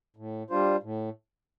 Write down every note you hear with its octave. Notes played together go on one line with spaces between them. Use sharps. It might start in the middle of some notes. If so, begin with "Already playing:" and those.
A2
G3 D4 F4 C5
A2